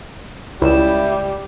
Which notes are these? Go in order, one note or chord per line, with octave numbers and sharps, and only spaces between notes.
C#2 G3 E4 E7